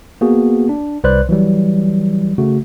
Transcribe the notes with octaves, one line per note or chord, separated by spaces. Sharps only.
A#3 B3 F#4 G#4
D4
C2 B4 C5 D5 F#6
E3 F#3 G3
C#3 A3 F#4